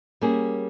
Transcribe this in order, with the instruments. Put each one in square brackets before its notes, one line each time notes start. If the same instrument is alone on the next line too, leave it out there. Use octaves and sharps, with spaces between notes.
[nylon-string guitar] G3 A#3 C#4 G#4